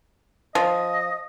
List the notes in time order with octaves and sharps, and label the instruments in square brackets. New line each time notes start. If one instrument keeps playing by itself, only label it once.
[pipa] F3 [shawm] D#5